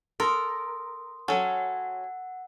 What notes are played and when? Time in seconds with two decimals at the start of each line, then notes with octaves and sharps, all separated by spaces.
0.20 A4 A#4 C6 D#6
1.28 F#3 C#4 A4 F#5